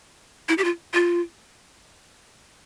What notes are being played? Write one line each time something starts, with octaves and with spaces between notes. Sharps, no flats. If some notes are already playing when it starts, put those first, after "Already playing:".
E4
G4
F4
F4